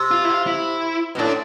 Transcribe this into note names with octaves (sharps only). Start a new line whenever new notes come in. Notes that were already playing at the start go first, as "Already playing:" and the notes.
Already playing: C3
F4
E4
F4
E4
B2
A2 D4